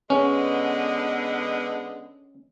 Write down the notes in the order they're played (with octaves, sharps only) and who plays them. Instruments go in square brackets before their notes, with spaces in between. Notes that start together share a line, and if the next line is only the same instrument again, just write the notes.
[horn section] D3 G#3 B3 [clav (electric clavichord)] C#4